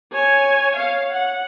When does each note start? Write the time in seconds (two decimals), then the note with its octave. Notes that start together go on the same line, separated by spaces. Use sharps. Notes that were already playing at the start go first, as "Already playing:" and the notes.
0.12 C#5 G#5
0.76 C#5 F5
1.12 F#5